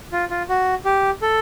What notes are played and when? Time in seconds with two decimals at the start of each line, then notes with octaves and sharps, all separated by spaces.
0.12 F4
0.30 F4
0.49 F#4
0.85 G4
1.22 A4